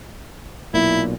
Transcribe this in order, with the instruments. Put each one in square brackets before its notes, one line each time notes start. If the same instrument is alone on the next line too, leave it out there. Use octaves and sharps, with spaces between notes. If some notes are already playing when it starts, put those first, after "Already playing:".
[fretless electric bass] B1 A#2 [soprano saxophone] E4